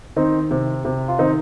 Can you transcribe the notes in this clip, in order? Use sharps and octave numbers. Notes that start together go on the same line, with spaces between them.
D#3 C4 D#4
C3
C3
F4
D#3 C4 D#4